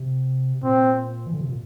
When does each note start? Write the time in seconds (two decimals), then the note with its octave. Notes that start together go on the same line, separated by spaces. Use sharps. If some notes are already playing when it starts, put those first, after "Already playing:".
Already playing: C3
0.63 A#2 C4
1.26 E3
1.34 D3
1.41 C3
1.49 A#2